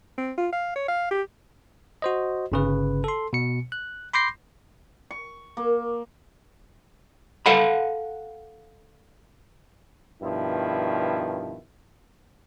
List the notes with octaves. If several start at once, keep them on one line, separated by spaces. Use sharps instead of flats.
C4
F4
F5
C#5
F5
G4
F#4 C5 D#5
G1 C#3 B4
A4 C6
B2 C#7
F#6
B5 C6 D6 G6 A#6 C7
C#6
A#3
A4 F5 F#5 B5
G2 B2 D#3 F3 E4